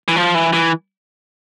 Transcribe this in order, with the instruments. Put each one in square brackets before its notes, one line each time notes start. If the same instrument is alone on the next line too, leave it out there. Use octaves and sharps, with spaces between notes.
[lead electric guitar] E3
F3
E3
E3